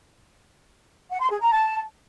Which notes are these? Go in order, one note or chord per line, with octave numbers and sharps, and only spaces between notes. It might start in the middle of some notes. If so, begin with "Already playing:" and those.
F#5
C6
G#4
A#5
A5